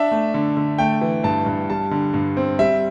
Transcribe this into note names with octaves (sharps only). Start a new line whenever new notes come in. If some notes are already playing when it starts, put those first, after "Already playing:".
Already playing: D4 E5
A3
D3
D3
A3 G5
E3
G2 A5
G2
G3 A5
D3
G2
C4
G3 E5